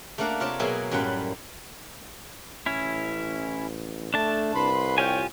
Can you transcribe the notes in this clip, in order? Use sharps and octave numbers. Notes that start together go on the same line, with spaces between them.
A3 A#3 D4 F5 F#5 A#5
C3 F4 A#4 C#5 D5 A5
B2 F#3 A#3 G#4 D#5 E5
F#2 A2 G3 F4 F#5 B5
A1 C#4 E4
A3 D4 A5
C2 B4 B5 C6
F4 G4 C#5 G5 G#5